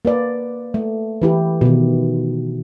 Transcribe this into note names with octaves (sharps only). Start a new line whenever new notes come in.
A#3 B4 D5
A3
E3 E4 G4
B2 D#3